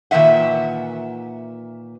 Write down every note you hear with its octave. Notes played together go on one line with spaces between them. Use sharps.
A#2 D#3 E3 E5 F#5